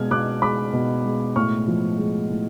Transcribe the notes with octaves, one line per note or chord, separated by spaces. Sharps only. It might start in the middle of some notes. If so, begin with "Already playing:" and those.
Already playing: B2 G#3 F6 G#6
B2 D6 F#6
G#3 B5 D6
B2
G#3
A2 C#6 F6
F3
G#3
A2